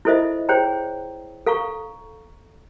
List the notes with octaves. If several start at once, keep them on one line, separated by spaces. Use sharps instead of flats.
E4 F4 A4 C5 D#5 E5
G#4 C5 C#5 G5 A#5
A4 F5 A#5 C#6